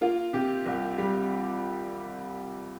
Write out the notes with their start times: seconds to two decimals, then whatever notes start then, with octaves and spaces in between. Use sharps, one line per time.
0.01 A#3 F4
0.33 C3 G4
0.66 C2
0.98 G3